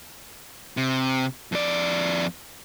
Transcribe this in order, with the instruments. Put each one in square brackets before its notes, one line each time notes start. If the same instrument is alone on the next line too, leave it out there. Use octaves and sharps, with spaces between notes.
[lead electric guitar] C3
F2 D5